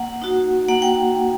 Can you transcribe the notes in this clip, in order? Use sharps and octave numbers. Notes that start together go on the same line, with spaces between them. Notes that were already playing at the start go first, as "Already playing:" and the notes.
Already playing: A#3 F#5
D#4 F#4
A#3 F#5
G5